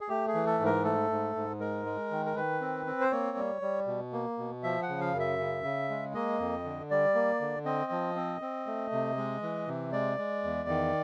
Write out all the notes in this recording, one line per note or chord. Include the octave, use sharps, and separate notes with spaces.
G#4
A3 G4
G#4
E3
A4
G#2
A#4
A3 A4
G#2
G#2
G#3 A#4
G#3
D#3
A#4
D#3 B4
C4
C4
C5
A#3 C#5
G3
G3
B2
A#3
B2
F3 E5
F#5
C#3
F5
F#2
E5
C#3
C#3
G#3
A#3 D#5
F2
D3
G3 D5
A#3
D3
C4 D#5
F3
C4
C4
A3
C3
G#3
E3
C3
G#3 D5
G#3
E2
D#3